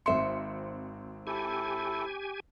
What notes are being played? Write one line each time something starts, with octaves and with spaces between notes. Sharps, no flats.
G#1 C4 E5 C6 C#7
E4 G4 A4 G#5